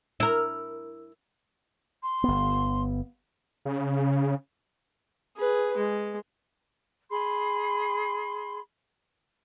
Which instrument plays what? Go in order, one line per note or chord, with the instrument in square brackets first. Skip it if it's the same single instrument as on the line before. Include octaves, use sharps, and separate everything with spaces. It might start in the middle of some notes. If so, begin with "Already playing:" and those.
[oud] E4 A#4
[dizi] C6
[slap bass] G1 B3
[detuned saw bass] C#3
[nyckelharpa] G#4 B4
G#3
[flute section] G#4 B5 C6